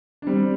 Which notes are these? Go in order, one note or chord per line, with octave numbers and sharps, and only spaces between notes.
D4
G3 C4